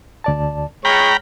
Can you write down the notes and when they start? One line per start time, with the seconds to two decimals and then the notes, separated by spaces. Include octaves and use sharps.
0.24 D2 D5 A5
0.85 G#3 C#5 G5 A#5 B5 F6